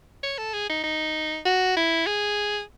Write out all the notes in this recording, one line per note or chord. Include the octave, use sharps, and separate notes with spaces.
C#5
A4
G#4
D#4
D#4
F#4
E4
G#4